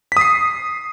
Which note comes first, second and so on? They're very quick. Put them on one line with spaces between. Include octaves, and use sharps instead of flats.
B6 D#6 C7